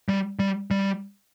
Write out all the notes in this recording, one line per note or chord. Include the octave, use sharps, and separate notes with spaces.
G3
G3
G3